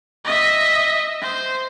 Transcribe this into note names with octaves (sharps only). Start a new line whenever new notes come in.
D#5 E5
C5